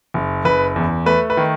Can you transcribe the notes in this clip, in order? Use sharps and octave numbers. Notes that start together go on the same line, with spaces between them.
F#1
F#1 B4
E2
A3 B4
B4
D#3